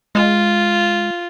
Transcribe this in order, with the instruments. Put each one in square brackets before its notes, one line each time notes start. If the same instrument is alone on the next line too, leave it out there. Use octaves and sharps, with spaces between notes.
[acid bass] G#3 [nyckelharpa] F4